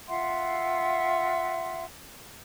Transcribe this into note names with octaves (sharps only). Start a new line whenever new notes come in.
F4 E5 F#5 C6